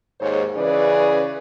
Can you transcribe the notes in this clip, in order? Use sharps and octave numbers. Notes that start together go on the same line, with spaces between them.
D#2 G#2 G#4 C5 C#5
C#3 E3 C#4 G#4 B4 D5